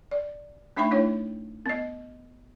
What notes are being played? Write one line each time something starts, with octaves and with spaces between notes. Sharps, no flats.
D5
A3 D4 D#4 E5 G5 B5
A3 D4 E4 C#5
B3 D#5